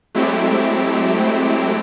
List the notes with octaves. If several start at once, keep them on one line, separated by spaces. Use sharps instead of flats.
F#3 G#3 A3 C4 E4 G4